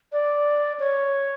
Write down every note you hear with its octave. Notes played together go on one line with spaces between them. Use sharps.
D5
C#5